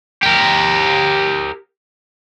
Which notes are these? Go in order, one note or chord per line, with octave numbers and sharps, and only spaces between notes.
G4 A#4